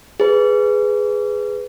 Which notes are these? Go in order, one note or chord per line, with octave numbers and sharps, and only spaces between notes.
G#4 B4